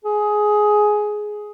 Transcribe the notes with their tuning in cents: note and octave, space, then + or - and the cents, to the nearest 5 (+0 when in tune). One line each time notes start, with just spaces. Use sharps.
G#4 +10